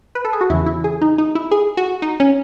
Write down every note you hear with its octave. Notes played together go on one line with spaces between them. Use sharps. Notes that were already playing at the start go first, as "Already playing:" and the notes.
B4
A4
G#4
F#4
E2 C#3 E3 E4
E4
G#4
D#4
D#4
E4
G#4
F#4
D#4
C#4